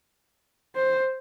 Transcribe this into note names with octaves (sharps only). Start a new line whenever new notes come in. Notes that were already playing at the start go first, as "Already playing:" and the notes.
C5